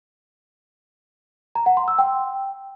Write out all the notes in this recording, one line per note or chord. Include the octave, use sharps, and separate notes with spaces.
A#5
F#5
C6
E6
G5